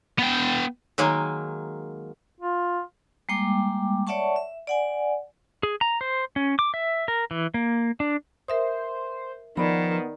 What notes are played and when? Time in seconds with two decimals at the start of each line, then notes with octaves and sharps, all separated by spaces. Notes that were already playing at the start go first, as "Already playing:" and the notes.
0.19 B3 G5
0.98 D#3 F#3 G#3 A#3
2.41 F4
3.29 G3 G#3 A#3 G5 D6
4.07 C#5 D5 E5 F#5 A5 C#6
4.36 E5
4.67 D5 F#5 G#5
5.63 G#4
5.81 A#5
6.01 C5
6.36 C#4
6.59 D6
6.74 E5
7.08 A#4
7.31 E3
7.54 A#3
8.00 D4
8.48 A#4 C5 E5 D#6
9.57 D#3 F3 B3 D5 B5